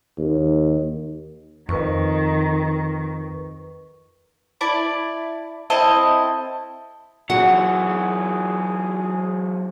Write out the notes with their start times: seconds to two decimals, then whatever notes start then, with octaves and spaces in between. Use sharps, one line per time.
0.18 D#2
1.69 F2 D#3 B4 C#6
4.61 E4 D5 A5
5.70 C4 E4 A4 D#5
7.30 E3 F#3 F#4 G#4 F#5